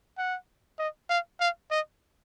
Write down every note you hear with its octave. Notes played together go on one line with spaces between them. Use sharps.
F#5
D#5
F5
F5
D#5